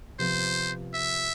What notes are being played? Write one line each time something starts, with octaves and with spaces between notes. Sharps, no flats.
C3 F3 B3 C5
E5